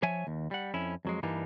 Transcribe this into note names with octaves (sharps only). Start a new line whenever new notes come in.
F3 C#5 E5 G#5
D#2
G3 F#5
F2 C#4 E4
F2 F#3 G#3
G2 E3 G3 A#3 D4 D#4